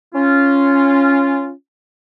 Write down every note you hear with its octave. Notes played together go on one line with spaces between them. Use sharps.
C#4 F4